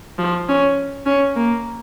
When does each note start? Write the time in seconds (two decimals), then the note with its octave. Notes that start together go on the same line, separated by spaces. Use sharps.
0.19 F3
0.49 C#4
1.06 C#4
1.36 A#3